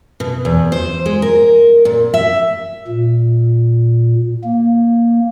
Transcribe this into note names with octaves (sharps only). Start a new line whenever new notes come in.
B2
E2
C5
G#3
A#4
A#2
E5
A#2
A#3